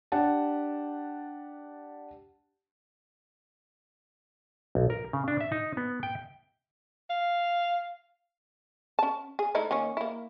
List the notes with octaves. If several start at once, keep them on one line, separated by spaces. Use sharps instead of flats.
D4 G4 F#5 A5
B1
A#4
C#3
D4
E5
D#4
B3
G5
F5
C#4 A5
G#4
A3 D#4 E4
D#3 A#3 C#4
A#3 E4